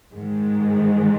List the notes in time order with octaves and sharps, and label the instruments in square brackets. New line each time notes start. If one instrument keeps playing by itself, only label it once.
[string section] G#2 D#3 G#3